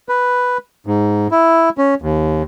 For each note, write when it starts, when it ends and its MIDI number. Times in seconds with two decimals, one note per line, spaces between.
0.09 0.58 71
0.86 1.27 44
1.31 1.69 64
1.78 1.94 61
2.02 2.43 39